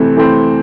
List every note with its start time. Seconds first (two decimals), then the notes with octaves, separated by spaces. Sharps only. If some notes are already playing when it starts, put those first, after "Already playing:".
Already playing: C3 E3 A3 C4
0.16 E3 A3 C4